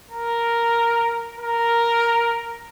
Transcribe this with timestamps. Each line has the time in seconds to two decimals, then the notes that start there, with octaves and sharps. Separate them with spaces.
0.11 A#4
1.38 A#4